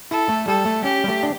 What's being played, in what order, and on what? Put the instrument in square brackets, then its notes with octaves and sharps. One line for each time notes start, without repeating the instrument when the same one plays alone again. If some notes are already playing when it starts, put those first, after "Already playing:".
[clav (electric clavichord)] E4 [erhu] A4
[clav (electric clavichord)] A3
[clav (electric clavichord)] G3 [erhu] A4
[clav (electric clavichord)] A3
[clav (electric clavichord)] C#4 [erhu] G4
[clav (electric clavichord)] G3
A3
D4